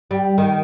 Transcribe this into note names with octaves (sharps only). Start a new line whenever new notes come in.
G3
D#3